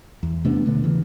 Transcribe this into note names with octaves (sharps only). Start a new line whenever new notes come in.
E2
C3 A3 B3 D4
B2 D3 A3
C#3 E3